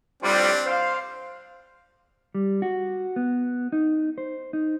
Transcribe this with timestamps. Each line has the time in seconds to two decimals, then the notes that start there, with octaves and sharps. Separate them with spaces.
0.23 A2 F3 G3 C4 D4
0.66 C5 F5
2.35 G3
2.62 F#4
3.16 B3
3.72 D#4
4.18 C5
4.53 D#4